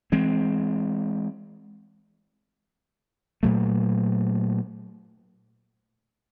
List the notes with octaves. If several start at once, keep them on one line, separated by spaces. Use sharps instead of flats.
E3 G#3 C4
A#2 F#3 A3